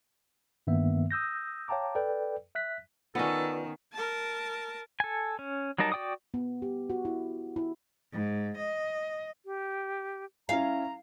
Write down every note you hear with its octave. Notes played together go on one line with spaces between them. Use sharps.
G2 D#3 A#3 B3 E5
D#6 E6 G6 A#6
C#5 F5 G5 A5 A#5 D6
A4 B4 D5 G5
E5 F#6 B6
D#3 B3 C#4 F4 A4 B4 D5
A#4 A5
A4 G#5
C#4
F#3 G3 D#4 A#4 A5
F#4 D5 G5 D6 D#6
B3
G4
F#4
E4
E4
G#2
D#5
G4
C#4 E4 F5 G#5 A#5